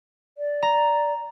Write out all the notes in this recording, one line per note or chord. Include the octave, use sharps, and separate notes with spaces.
D5
A#5